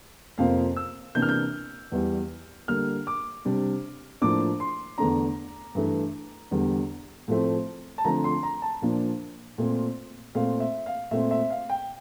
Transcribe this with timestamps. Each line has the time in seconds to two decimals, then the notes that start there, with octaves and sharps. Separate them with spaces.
0.38 F2 C3 F3 A#3 F5
0.76 E6
1.15 C3 E3 A#3 D4 G6
1.22 F6
1.29 G6
1.92 E2 E3 G3
2.68 D3 G3 A#3 F6
3.07 D6
3.45 C3 G3 D4
4.22 A2 F3 A#3 D4 D6
4.60 C6
4.98 E2 D3 A3 D4 A#5
5.75 G2 E3 A3
6.51 E2 D3 G3
7.28 A2 F3 A3 C4
7.98 A5
8.05 D3 F3 A3 C4 A#5
8.24 C6
8.43 A#5
8.62 A5
8.82 A#2 F3 A#3 D4
9.58 A#2 A3 C4
10.35 A#2 A3 C4 F5
10.60 E5
10.86 F5
11.11 A#2 A3 C4 E5
11.31 E5
11.50 F5
11.69 G5